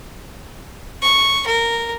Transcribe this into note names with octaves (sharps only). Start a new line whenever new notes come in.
C#6
A#4